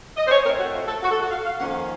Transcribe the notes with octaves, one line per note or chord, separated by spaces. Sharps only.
D#5
C5
C#5
A2 A3 C4 A#4
F#4
F4
A4
F#4
A4
F#4
F5
F5
F2 D#3 A#3 C#4 F#5
F5